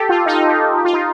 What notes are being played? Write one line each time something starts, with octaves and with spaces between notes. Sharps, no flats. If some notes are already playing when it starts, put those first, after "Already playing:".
Already playing: G4 A4
F4
D#4
G4
F4
G4
F4
D#4